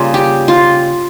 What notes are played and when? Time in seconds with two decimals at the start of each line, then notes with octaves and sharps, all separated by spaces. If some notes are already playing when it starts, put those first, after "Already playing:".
Already playing: C#3 G3 A#3 F4
0.14 G4
0.48 F4